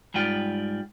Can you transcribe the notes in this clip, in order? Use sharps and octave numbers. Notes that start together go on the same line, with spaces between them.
G#2 G3 F4 G5